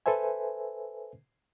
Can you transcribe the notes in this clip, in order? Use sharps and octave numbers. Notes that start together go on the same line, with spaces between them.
A4 B4 C5 E5 G#5